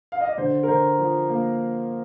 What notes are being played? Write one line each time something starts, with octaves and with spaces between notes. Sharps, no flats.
F5
D#5
D5
D3 C5
A#4
D3 C5
F3
A#3